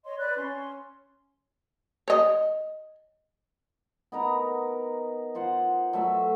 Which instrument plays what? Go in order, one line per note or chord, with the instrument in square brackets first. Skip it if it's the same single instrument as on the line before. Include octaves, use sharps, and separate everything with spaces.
[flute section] C#5 D#5 C6
B4 D5 F#6
C#4 C6
[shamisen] C#5 D#5
[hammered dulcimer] B3 D#4 A#4 A#5
F4 C5 F#5
F#3 A3 E5